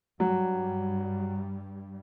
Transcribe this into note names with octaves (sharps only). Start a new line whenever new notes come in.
G2 F#3 G3